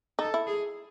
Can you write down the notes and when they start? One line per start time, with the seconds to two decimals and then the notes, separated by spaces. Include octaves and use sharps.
0.19 D#4 A4
0.34 E4
0.47 G#4